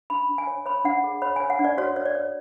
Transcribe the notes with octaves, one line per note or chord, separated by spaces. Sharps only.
D4 B5
D4
G#5
C#5
C#5 B5
D4 F#5
G#4
C#5 B5
G#5
C#5
F#5
D4
D5
F#4 C#5
C#5
D5
C#5